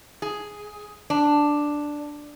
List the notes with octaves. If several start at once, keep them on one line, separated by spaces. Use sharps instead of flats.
G#4
D4